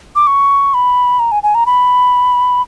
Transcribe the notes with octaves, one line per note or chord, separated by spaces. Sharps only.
D6
C#6
B5
A#5
G#5
G#5
A#5
B5